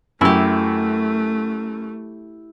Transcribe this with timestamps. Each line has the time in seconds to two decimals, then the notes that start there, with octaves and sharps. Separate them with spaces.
0.21 F#2 A3 E4 G4